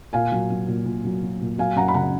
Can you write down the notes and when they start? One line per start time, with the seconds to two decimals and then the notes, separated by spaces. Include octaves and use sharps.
0.13 A#2 F5 G#5
0.32 F#3
0.50 F#3
0.68 A#2
0.86 A#2
1.05 F#3
1.23 F#3
1.41 A#2
1.58 F#3 F5 G#5
1.76 F#2 F#5 A#5
1.88 B5
1.94 C#3 F#5 A#5